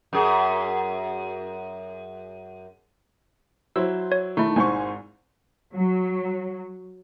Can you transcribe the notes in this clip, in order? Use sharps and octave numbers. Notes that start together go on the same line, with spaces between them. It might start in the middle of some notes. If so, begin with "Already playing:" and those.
F#2 G#4
F#3 E4 C5 E6
C#5
D#3 A3 D#4 E4
G#1 G#2 C5 G#5 C#6
F#3